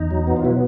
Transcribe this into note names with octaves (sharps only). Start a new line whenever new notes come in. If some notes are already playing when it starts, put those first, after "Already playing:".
Already playing: E2 D#4
F#3
B3
F4
B2 E4